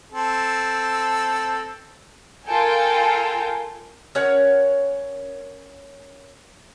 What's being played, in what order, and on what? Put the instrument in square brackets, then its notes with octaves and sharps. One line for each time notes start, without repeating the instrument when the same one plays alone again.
[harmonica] C4 A4
[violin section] F4 A4 A#4 G5 G#5
[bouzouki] C#4 A#4 C#5 F#5